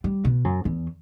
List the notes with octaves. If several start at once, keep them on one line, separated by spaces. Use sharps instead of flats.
G3
B2
F#2
E2